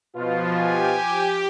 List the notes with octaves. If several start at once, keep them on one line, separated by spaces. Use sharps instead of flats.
B2 F3 F4
G4 G#5